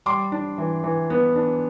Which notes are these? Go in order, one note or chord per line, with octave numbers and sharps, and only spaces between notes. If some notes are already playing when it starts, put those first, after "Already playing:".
G3 C6 D6
D4
E3
E3
B3
D4